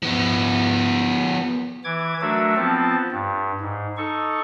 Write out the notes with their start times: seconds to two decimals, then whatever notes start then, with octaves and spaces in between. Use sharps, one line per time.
0.02 F3 B3
1.84 E3 D6 G#6
2.21 F#3 A3 D4 F#4 A#4 E5
2.56 F3 B3 C4 F4 A5
3.12 G2
3.61 G#2
3.97 D#4 A4 C#6